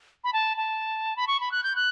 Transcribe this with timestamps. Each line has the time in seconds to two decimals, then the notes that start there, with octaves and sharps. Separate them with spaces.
0.24 B5
0.33 A5
0.57 A5
1.16 B5
1.27 C#6
1.40 B5
1.52 F#6
1.63 G6
1.76 F#6